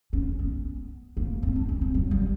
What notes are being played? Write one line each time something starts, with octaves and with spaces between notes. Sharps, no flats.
C#4
B3
A#3
C4
D4
C#4
C4
F#3
G3